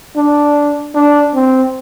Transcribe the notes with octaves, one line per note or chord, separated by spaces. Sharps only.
D4
D4
C4